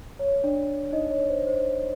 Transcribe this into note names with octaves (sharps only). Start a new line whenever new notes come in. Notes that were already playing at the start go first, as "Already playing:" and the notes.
C#5
D4 D5
D#4 D#5
C#5
C5
C5